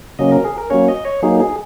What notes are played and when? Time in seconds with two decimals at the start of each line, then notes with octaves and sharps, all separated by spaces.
0.19 C#3 F#3 A#3 C#4 D#5
0.32 A#4
0.45 G#4
0.58 A#4
0.70 F#3 A#3 C#4 C#5
0.88 D#5
1.05 C#5
1.23 F#3 A#3 D#4 G#4
1.40 G#4